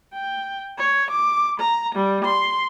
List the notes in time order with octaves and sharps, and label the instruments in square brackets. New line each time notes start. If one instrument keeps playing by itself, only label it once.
[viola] G5
C#5
D6
A#5
G3
C6